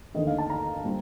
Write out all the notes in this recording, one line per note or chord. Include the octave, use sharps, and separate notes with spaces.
D#2 D3 A3 C4 D#5
F5
A5
A#5
A#2 G3 C4